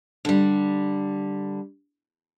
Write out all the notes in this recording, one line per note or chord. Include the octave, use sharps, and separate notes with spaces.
D3 G3